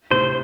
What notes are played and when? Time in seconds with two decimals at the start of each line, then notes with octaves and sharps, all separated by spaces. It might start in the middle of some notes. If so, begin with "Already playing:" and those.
0.11 A2 C3 C5